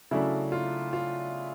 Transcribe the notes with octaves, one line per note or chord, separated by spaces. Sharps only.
C#3 F#3 A3 D4 E4
F4
F4